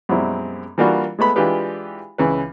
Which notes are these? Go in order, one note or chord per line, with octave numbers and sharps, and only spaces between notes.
F#2 B2 G3 G#3 C4 E4
E3 G3 A#3 D4 F4 F#4
G#3 A3 B3 B5
E3 G#3 D4 F4 G4 B4
C#2 C#3 E3 C#4 B4